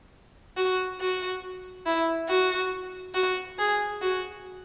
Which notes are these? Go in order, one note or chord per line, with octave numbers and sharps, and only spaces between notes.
F#4
F#4
E4
F#4
F#4
G#4
F#4